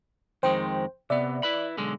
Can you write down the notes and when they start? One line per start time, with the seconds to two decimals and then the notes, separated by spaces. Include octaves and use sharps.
0.43 F2 D#3 G#3 C5 G5
1.10 C3 B3 D5 E5
1.43 E4 B4 B5
1.77 B1 D3 G#3